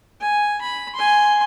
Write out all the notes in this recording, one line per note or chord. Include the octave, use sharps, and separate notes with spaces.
G#5
B5
G#5 C6